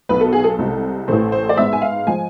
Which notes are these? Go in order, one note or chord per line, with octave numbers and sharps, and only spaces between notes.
B1 B2 B3 B4
A4
G#4
A4
C2 C3 G#3
A1 A2 E3 A3 C5
C5
D5
G#2 G#3 B3 E5
G#5
F5
F3 G#3 G#5